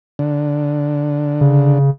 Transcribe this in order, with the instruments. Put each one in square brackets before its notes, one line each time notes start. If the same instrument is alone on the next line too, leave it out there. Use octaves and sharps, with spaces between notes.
[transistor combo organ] D3
[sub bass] C#3